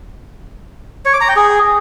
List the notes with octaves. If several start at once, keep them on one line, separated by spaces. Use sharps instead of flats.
C#5
D6
A#5
G5
G#4